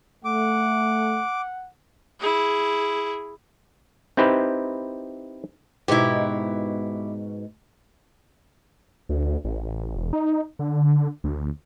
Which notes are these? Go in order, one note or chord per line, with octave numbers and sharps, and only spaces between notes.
A3 F#5 D6
E4 G#4
C4 D#4 E4 G4 B4 C5
G#2 B2 D#4 E4 G4
D2
A1
E1
D#4
D3
D2